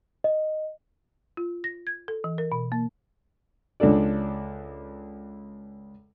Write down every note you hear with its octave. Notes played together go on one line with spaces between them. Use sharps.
D#5
F4
A#6
G#6
A4
E3
A#4
B2
A#3
C#2 D4 A4 D5